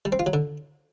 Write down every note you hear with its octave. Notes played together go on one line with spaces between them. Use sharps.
G3
C4
F4
F#3
D3